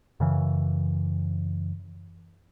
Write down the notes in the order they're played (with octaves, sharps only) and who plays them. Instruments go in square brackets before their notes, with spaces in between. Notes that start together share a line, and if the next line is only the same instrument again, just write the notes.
[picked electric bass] F#2 C#3 E3